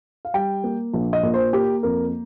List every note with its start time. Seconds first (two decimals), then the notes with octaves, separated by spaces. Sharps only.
0.25 F5
0.34 G3 G5
0.64 A#3
0.94 A#1
1.13 D#5
1.23 A#2
1.34 C5
1.53 A#3 G4
1.83 F2 A#4